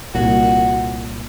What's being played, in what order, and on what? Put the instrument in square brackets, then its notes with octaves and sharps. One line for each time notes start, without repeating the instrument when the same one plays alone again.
[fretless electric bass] C2 A#2 [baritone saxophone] F#4